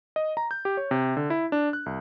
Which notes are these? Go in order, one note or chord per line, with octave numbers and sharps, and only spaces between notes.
D#5
A#5
G6
G4
C#5
C3
D3
E4
D4
F#6
C2